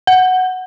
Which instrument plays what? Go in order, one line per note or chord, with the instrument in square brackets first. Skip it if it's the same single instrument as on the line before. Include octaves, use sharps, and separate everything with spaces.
[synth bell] F#5